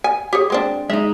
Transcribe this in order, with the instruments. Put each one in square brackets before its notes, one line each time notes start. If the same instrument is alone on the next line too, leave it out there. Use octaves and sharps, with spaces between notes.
[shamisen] G#5
G4 G#4 C#5
G#3 C4 D4
[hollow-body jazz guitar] G#3 D#4 [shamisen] E5